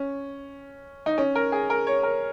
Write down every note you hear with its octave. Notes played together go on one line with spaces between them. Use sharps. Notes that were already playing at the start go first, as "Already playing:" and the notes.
Already playing: C#4
D#4
C#4
A#4
G#4
A#4
C#5
A#4